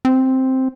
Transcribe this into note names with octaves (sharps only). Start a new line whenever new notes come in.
C4